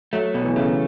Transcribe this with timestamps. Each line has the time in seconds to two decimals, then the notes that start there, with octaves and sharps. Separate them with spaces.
0.13 F#3 A3
0.34 B2
0.44 E3
0.56 C#3 A3